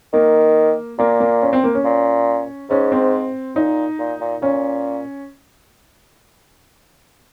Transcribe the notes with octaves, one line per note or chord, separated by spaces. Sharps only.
D#3 A#3
A#2 A#3
A#3
C#4
C4
A#3
C#4
A#2
G#2 C#4
C4
A#2 D#4
A#2
A#2
A#2 C#4